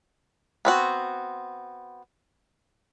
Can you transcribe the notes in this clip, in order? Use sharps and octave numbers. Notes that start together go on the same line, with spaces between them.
B3 C4 F#4